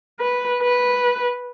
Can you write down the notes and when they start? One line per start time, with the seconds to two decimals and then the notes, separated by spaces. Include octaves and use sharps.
0.20 B4
0.63 B4